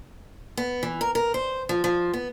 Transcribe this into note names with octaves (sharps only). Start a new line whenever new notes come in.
B3
E3
A#4
A#4
C5
F3
F3
B3